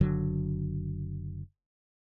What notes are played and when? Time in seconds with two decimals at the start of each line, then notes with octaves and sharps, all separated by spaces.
0.01 F#1 D3 F#3